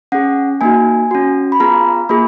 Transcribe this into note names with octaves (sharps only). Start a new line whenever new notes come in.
C#4 G#4 F#5
A#3 D#4 F#4 G#5
C#4 F#4
B5
B3 F4 G#4 A#5
A#3 F4 G#4 B5